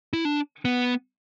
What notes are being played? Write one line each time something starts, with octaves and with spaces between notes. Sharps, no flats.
E4
D4
B3